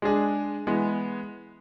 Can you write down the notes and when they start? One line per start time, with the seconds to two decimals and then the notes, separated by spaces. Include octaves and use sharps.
0.02 G#3 D4 G#4
0.67 E3 G#3 B3